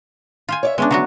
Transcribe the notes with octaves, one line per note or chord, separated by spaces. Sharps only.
F4 C5 G#5
C#5 D5 E5
G#3 B3 C#4 D4
D3 F#3 B3 F#4